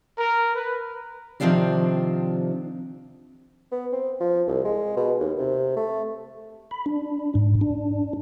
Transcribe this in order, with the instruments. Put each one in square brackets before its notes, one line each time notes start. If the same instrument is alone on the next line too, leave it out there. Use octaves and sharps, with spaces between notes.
[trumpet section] A#4
B4
[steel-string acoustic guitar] C3 D#3 F3 C4 D4 G4
[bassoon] B3
C4
F3
C2
G#3
B2
D#2
C3
A3
[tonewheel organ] B5
D4
G#2
D4